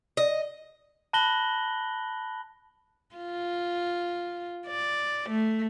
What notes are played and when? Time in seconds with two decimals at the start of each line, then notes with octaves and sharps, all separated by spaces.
0.17 D#5
1.13 A5 B5 F#6 A#6 F#7 G7
3.16 F4
4.67 D5
5.30 A3